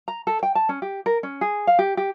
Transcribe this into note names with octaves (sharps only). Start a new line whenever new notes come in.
A#5
A4
G5
A5
C#4
G4
A#4
C#4
G#4
F5
G4
G4